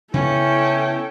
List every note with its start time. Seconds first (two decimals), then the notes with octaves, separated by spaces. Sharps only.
0.14 C#3 B3 C#4 E4 A4 G5